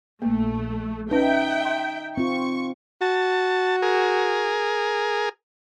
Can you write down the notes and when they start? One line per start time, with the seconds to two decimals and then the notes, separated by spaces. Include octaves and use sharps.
0.22 A#1 A3 A#3
1.11 C#4 D#4 B4 E5 G5
1.65 C6
2.17 C4 F4 C#6
3.01 F#4 A5
3.82 G#4 A#4